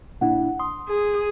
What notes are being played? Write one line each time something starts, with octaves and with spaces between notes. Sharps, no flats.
A#2 D4 E4 F#5
C6 D#6
G#4